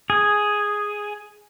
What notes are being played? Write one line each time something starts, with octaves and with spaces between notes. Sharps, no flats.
G#4